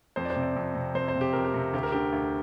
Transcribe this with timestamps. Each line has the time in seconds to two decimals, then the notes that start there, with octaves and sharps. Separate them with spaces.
0.16 F2 C5
0.25 D5
0.30 C5
0.36 C3
0.43 D5
0.56 F2
0.75 C3
0.95 F2 C5
1.08 C5
1.15 C3
1.21 G4
1.33 F2 A#4
1.45 G4
1.54 C3
1.74 D2 G4
1.83 A#4
1.92 D3 G4
2.13 D2